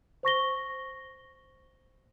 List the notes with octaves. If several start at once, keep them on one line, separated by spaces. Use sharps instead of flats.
C5 C#6 A#6 G7